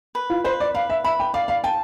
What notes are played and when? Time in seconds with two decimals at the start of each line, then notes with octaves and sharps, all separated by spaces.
0.15 B4
0.30 F4
0.44 B4 C5
0.60 D5
0.75 B4 F5
0.90 E5
1.04 E5 B5
1.20 G5
1.34 D5 F5
1.48 F5
1.64 G5 A5